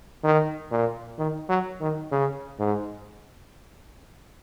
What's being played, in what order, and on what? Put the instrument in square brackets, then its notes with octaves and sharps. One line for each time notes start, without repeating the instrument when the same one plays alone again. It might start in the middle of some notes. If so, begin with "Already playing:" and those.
[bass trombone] D#3
A#2
D#3
F#3
D#3
C#3
G#2